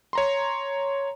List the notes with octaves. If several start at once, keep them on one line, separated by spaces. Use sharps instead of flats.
C#5 A#5 C6